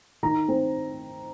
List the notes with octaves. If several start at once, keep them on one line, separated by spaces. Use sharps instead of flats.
D#3 A#5
C4